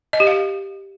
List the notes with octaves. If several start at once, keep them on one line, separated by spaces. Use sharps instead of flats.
D#5
G4
F5